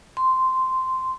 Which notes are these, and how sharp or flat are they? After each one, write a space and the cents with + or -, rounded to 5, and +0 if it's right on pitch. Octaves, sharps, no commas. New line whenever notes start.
C6 -10